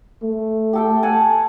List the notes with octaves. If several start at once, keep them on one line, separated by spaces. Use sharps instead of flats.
A3
G4 A4 G5
F#5 G#5 A5